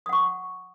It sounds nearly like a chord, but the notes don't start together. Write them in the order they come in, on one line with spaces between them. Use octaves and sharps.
D#6 F#5 C#6